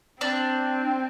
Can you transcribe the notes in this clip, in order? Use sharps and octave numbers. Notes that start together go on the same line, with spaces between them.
C4 D4